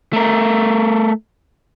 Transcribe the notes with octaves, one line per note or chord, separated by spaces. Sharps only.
A3 A#4